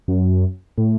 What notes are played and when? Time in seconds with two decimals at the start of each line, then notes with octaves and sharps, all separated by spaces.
0.08 F#2
0.78 A2